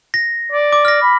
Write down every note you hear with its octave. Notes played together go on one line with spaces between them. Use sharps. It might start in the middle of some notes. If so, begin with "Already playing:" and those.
A#6
D5
D6
F6 A#6
B5